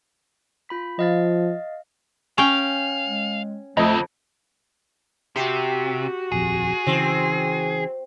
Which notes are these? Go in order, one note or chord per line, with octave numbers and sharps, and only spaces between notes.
F4 B5 B6
F3 D#5 F5 A6
C#4 F5 G5
G#3
F2 D3 A3 C4 D#5
C3 F#4 G4
D#1 A#1 F2 G#4
C#3 E3 C4